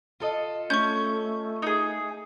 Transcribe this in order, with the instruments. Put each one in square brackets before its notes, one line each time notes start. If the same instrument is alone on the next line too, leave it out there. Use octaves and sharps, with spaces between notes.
[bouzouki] F4 A4 D#5
[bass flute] A3 [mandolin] C#4 [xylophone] C#6 G6
[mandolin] D#4 G#4